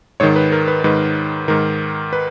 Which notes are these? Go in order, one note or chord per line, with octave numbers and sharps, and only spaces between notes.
G#2 D#3 C#5
B4
A#4
B4
G#2 D#3 B4
G#2 D#3 A#4
B4